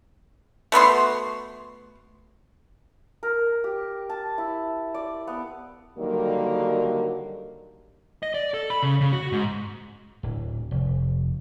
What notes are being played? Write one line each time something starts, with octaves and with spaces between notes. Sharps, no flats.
A3 B3 F#4 C6
A#4
G4
A5
E4
D5
B3
D3 D#3 F#3 G3 A#3
D#5
D5
A4
B5
C#3
C#3
F#4
G#2
D1
F1